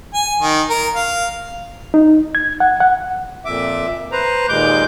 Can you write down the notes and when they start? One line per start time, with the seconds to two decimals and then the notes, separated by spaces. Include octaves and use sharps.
0.14 G#5
0.41 D#3
0.70 A#4
0.95 F5
1.94 D#4
2.35 G#6
2.60 F#5
2.80 F#5
3.45 F2 A#2 E5 D6
4.12 B4 C5 A#5
4.49 D#2 A#2 G#3 D6 G6